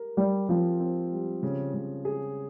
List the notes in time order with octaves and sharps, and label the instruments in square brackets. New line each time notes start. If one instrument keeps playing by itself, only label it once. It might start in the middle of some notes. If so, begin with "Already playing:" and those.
Already playing: [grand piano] G4 A#4
[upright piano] G3 [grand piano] G4
[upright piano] F3 [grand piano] C4
[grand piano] C4
G3
C#3
C#3
G#4